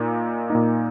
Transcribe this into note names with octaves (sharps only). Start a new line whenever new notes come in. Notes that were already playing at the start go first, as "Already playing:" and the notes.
Already playing: A#2 A#3 D#4
A#2 A#3 D#4